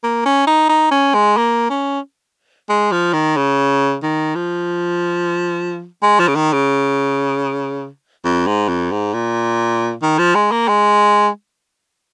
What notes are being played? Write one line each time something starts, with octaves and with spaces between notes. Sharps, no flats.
A#3
C#4
D#4
D#4
C#4
G#3
A#3
C#4
G#3
F3
D#3
C#3
D#3
F3
G#3
F3
C#3
D#3
C#3
F2
G#2
F2
G#2
A#2
D#3
F3
G#3
A#3
G#3